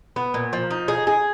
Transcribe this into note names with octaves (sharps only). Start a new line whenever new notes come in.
B3
A#2
F3
D#4
G#4
G#4